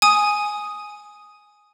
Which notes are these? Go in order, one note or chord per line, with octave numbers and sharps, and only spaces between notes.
G#5 D#6